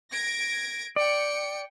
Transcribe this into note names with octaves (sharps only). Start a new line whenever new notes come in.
G#6 A#6 D7
D5 G5 C#7